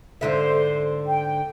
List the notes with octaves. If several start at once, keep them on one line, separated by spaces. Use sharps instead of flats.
G#2 D3 C5 E5
G5